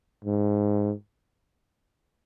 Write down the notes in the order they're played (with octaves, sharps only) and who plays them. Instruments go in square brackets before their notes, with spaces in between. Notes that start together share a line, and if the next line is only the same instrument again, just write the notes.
[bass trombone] G#2